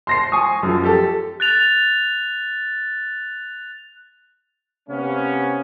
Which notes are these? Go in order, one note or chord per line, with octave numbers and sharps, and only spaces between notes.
C6 A#6 C7
G#5 C#6 D#6
F#2 F3
G4 A4
F#6 A6 F7
C3 A#3 B3 C#4